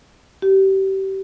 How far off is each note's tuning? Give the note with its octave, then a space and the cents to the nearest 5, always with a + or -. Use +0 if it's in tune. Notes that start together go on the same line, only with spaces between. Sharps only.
G4 -30